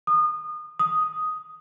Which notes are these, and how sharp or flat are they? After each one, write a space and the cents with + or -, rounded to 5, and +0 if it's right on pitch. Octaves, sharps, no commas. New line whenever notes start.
D#6 -30
D#6 +5